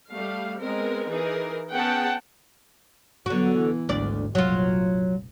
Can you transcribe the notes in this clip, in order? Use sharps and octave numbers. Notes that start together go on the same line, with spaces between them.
G3 A3 F5
G#3 B3 C4 A#4
E3 D#4 G#4 A#4
B3 C#4 G#4 F#5 G5 A5
D3 F#3 B3 F#4
E3
G#1 D2 D5
F1 A#1 F#3 F4